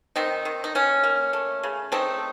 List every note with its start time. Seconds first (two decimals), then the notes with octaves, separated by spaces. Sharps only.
0.16 D#3 C4 D#4
0.45 D#3
0.64 D#4
0.75 A#3 C#4
1.04 A#3
1.33 A3
1.63 C#3
1.92 A3 C4 D#4